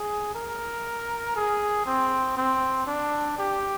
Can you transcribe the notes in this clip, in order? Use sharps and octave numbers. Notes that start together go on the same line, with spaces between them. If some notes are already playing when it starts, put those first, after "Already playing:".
Already playing: G#4
A#4
G#4
C4
C4
D4
G4